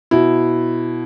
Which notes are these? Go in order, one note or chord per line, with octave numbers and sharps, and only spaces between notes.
B2 E4